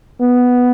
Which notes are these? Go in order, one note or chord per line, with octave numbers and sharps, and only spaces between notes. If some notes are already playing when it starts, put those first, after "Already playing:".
B3